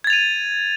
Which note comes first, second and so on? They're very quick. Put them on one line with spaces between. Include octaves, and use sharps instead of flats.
G#6 A6 F7 D#7